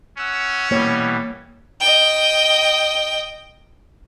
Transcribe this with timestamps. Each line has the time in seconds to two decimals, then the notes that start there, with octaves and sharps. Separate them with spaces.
0.18 C#4 F#5 E6
0.71 B2 E3 G3 A#3 C#5
1.81 D#5 G5